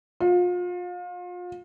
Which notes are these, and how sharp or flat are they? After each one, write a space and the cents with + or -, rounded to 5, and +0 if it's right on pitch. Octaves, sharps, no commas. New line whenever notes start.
F4 +35